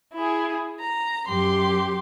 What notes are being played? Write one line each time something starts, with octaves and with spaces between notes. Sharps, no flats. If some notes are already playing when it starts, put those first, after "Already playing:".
E4 G#4
A#5
F#2 G4 C6